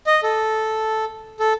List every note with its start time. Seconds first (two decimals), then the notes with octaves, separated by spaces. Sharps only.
0.07 D#5
0.23 A4
1.40 A4